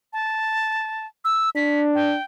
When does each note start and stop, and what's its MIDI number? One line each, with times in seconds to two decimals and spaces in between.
0.13 1.06 81
1.25 1.50 88
1.56 2.16 62
1.56 1.81 95
1.95 2.23 79